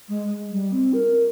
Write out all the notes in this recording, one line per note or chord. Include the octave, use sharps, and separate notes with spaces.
G#3
G3
C4
A#4